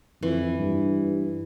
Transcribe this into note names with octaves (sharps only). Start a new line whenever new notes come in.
F2 E3
G2